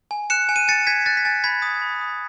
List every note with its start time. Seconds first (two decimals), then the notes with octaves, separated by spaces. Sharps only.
0.11 G#5
0.30 F#6 C#7 E7
0.49 G#5
0.56 D#7
0.68 G#5 A6 C#7
0.87 G#5 G#6 B6
1.06 F#6 A6
1.17 B6
1.25 G#5 A6
1.44 B5 G#6 B6
1.62 D#6
1.82 B5
2.01 D#6